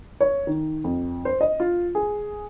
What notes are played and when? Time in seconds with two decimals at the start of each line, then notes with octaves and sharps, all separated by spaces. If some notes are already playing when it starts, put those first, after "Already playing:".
0.21 C#5
0.47 D#3
0.84 F2
1.25 C5
1.41 D#5
1.60 F4
1.95 G#4